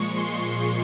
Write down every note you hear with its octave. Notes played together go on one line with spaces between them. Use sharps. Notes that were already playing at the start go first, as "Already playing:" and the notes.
Already playing: A#2 F3 G#3 C#6
C6